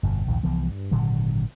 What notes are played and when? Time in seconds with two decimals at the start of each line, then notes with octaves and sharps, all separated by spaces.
0.03 G1 F2 B2
0.27 A#1 D#2 G#2 F3
0.43 C2 E3 F3 B3
0.69 G2
0.91 G#1 A#2 D3 F#3